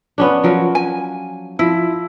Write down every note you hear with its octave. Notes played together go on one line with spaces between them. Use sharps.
B3 C#4 D4
F3 F#3 A#4
G#5
F3 E4